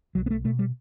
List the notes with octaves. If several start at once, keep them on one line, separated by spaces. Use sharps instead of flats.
B1 F#3
B3
A3
B2 A3
G3